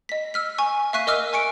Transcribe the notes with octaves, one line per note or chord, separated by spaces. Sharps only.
D#5 B6
E6 F6 B6
G#5 C#6
E5 F5 C#6 F#6 B6 D#7
A#4 D#5 E5 D6 E6 F6
G#5 C#6 C#7 D7